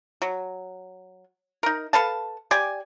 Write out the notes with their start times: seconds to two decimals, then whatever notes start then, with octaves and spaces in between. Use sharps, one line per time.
0.22 F#3
1.63 D#4 A#4
1.93 A4 B4 F5 A5
2.51 G4 D5 G5 G#5